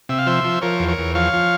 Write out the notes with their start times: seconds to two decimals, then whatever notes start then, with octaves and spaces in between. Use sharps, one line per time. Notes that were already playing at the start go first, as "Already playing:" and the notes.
0.09 C3 E5
0.19 F5
0.26 F3 C5 E5
0.44 F3
0.62 F3 A#4 C#5
0.79 E2
0.89 A#4 C#5
0.98 E2
1.15 F3 C#5 F5
1.33 F3